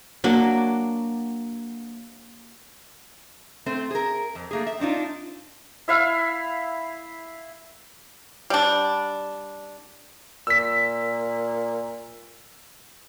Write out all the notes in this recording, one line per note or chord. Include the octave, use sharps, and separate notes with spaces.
F#3 A#3 D4
A3 C4
G#4 A#4
F2
A3 A#3 G#4
E5
C4 D4 D#4 F4
E4 E5 F5
G3 D4
A#2 E6 B6